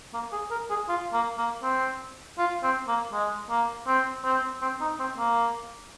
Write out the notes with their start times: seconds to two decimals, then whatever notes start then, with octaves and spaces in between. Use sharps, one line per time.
0.14 A#3
0.32 G#4
0.51 A#4
0.70 G#4
0.89 F4
1.13 A#3
1.38 A#3
1.63 C4
2.38 F4
2.63 C4
2.88 A#3
3.13 G#3
3.50 A#3
3.87 C4
4.25 C4
4.62 C4
4.81 D#4
5.00 C4
5.18 A#3